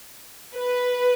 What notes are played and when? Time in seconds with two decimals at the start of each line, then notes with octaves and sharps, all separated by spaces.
0.56 B4